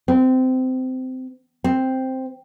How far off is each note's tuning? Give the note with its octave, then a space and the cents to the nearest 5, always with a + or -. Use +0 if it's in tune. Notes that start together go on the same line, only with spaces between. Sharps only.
C4 -20
C4 +0